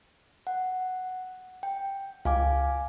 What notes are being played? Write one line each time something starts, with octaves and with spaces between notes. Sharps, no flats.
F#5
G5
C#2 F5 G#5 D6